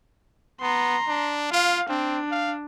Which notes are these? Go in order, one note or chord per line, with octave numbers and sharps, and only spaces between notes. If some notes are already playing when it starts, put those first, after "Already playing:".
B3 A#5 C6
D4
F4 F5
C4 D4
F5